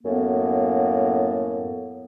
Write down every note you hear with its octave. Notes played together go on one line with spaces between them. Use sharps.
F#2 A2 A#3 B3